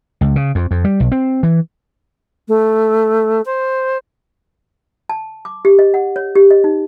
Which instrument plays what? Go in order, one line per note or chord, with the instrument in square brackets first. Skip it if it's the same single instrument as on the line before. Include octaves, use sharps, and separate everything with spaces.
[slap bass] C#2
C#3
F2
F2
G3
B1
C4
E3
[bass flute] A3
C5
[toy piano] A5
D6
G4
D#5
F#5
C#5
G4
D#5
D#4